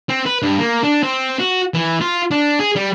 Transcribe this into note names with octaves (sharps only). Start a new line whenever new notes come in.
C4
B4
G2
A#3
D4
C4
F#4
E3
F4
D4
G#4
G3